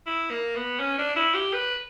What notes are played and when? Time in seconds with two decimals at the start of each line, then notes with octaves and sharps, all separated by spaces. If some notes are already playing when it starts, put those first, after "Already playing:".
0.07 E4
0.31 A#3
0.56 B3
0.80 C#4
0.98 D4
1.16 E4
1.34 G4
1.53 B4